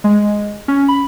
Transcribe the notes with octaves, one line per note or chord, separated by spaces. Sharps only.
G#3
C#4
B5